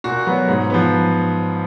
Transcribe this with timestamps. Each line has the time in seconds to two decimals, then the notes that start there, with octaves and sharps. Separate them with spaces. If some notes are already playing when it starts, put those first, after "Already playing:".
0.04 A#2 F#4
0.26 F#3 B3
0.48 G#2
0.70 F3 B3